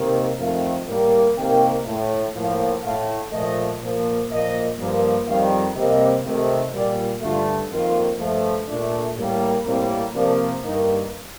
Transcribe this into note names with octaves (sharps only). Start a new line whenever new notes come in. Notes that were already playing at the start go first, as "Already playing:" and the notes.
Already playing: C3 D#3 A#3
F2 D#3 A3 F5
A2 G3 A#3
C3 D#3 A#3 G5
A2 A3
A2 F3 A#3 F5
A2 A3 F5
A#2 F3 A3 D#5
A#2 F3 A#3
A#2 F3 A#3 D#5
G2 F3 A#3
F2 D#3 G3 F5
C3 G3 A#3 D#5
C3 D#3 A3
A#2 G3 A#3 D5
G2 D3 A3 F4
F2 D#3 A#3 F4
G2 F3 A3
A#2 A3 D4
A2 G3 A#3
A2 G3 A#3 C4
C3 F3 A#3 D4
G2 D#3 A#3 D#4